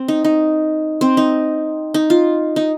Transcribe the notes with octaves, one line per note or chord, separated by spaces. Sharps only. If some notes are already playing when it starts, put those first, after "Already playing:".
Already playing: C4
D#4
D#4
C4
D#4
D#4
F4
D#4